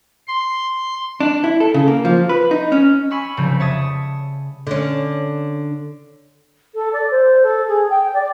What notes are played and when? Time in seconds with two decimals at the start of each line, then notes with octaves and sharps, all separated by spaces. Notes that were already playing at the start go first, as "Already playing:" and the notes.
0.27 C6
1.20 D4
1.44 E4
1.60 A4
1.74 C#3
1.88 A#3
2.05 F3
2.29 B4
2.51 D#4
2.72 C#4
3.11 G#5 B5 C#6 E6
3.37 F1 C#3 G3
3.60 C#5 E5 A5 D#6
4.67 D3 C#4
6.74 A4
6.92 D5
7.10 C5
7.43 A4
7.67 G#4
7.89 G5
8.13 D5